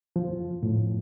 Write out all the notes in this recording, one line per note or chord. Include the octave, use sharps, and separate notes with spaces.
F3
A2